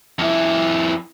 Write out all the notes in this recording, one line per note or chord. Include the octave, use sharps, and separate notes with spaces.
F2 E4